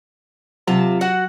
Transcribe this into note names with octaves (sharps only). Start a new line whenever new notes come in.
C3 F#3 F4 A5
F#4 F#5